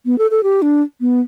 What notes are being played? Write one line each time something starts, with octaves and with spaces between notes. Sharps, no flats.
B3
A4
A4
G4
D4
B3